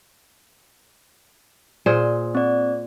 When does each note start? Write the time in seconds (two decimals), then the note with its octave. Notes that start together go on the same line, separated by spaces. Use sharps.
1.86 A#2 G#4 C5
2.35 C4 D5